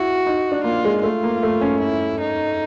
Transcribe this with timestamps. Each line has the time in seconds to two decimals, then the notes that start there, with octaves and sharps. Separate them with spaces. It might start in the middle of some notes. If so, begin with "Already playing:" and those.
Already playing: E4 F#4
0.27 D#4
0.52 D4
0.64 A#3 F4
0.84 G#3
1.03 A3 F4
1.24 A#3
1.43 A3
1.61 C#4
1.81 E4
2.21 D#4